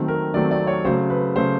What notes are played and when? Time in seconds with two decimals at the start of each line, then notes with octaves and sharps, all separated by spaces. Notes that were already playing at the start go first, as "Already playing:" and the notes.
Already playing: D#3 F#3 A3 C4
0.08 A#4
0.34 D#3 F#3 A3 C4 D5
0.51 D5
0.67 C#5
0.85 C#3 F#3 A3 C5
1.10 B4
1.35 C#3 F#3 A3 C5